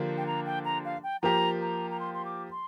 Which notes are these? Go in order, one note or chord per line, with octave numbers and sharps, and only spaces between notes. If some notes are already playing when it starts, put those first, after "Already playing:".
Already playing: D3 F3 A#3 D4 G4
G5
A#5
G5
A#5
F5
G5
F3 A#3 G4 A#5
A#5
A#5
C6
C6
D6
C6